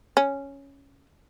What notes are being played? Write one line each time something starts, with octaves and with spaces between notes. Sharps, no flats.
C#4